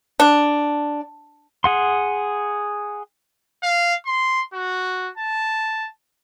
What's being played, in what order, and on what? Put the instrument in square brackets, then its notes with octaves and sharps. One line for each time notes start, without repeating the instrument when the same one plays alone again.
[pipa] D4
[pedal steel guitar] G#4 F#5 C6
[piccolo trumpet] F5
C6
F#4
A5